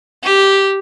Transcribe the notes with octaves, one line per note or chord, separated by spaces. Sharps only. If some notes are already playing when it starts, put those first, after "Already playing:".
G4